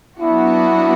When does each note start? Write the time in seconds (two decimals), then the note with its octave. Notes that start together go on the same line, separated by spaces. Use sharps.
0.19 F#3 B3 D4 E4 F#4